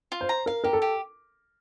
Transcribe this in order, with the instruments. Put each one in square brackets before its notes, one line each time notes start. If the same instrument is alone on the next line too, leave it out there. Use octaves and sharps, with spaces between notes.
[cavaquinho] F4
[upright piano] C5
[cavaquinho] A#5
[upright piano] A#4 [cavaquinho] F5
[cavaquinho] G4 [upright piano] A#4
[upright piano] A4
[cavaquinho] G4